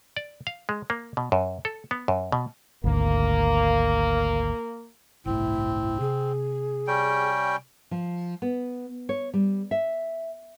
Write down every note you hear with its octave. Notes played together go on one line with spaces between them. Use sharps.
D5
F5
G#3
A#3
B2
F#2
A4
B3
F#2
B2
G#1 D2 A#3
G1 C2 A2 C4 E4
C3 G#4
G3 C#4 G5
F3
B3
C#5
G3
E5